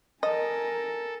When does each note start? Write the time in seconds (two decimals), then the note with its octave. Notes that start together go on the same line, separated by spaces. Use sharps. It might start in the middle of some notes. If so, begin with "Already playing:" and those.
0.23 A4 A#4 D#5 G#5